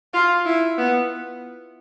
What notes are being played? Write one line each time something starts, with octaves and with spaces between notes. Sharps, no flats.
F4
E4
B3